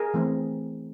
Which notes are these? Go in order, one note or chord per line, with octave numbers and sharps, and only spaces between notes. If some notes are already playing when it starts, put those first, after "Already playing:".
Already playing: G#4 A#4
E3 A3 C4